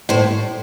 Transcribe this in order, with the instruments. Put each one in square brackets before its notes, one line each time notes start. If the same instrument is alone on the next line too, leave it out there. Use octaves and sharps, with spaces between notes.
[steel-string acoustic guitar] A2 C5